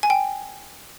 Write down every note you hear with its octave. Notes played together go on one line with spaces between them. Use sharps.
G#5
G5